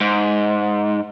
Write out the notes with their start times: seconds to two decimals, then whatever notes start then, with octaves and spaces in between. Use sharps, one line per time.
0.01 G#2